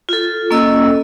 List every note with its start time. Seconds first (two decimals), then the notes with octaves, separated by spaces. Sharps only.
0.09 F4 A4
0.51 A#3 C#4 A4 D#5 E6